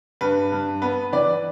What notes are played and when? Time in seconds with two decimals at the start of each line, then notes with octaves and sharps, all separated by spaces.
0.21 G2 B4
0.52 G2
0.82 B3 B4
1.13 E3 B4 D5